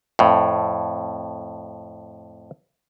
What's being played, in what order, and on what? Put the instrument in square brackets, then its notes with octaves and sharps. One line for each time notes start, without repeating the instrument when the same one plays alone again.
[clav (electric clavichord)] F2 A2